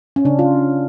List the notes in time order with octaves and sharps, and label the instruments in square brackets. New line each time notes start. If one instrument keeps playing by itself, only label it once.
[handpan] C#4
C#3 D4
F4